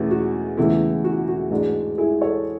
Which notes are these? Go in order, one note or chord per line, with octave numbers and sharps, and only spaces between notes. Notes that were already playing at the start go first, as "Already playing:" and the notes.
Already playing: E2 B2 A3 C#4 E4 G#4
F#4
E1 E2 C#3 E3 A3 E4
F#4
F#4
A1 G#2 G#3 D4
E4 G#4
A4 C#5